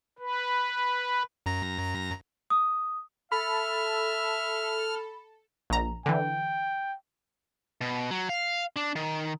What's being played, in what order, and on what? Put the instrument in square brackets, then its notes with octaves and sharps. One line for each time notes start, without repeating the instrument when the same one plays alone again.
[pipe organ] B4
[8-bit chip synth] F#2 A#5 A#6
[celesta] D#6
[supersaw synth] A4 [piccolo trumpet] E5 [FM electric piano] B5 [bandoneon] F6
[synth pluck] A#1 A#5
[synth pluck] D3 E3 [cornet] G5
[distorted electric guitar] B2
F#3
F5
D4
D#3